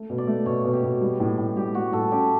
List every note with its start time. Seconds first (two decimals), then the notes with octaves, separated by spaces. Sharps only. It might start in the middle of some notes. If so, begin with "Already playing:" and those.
Already playing: A3
0.10 B2
0.18 D5
0.27 A3
0.46 B2 C#5
0.64 B2
0.73 G4
0.83 B2
1.01 G3
1.20 A2
1.38 A2
1.56 G3 G4
1.74 G3 F#4
1.92 A2 A4
2.11 C#4 G4